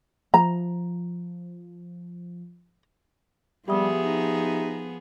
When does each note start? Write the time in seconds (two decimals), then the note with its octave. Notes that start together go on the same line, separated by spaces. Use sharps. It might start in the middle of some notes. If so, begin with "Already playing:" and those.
0.34 F3 A#5
3.68 F3 G3 B3 G4 G#4 E5 D#6
4.01 D#4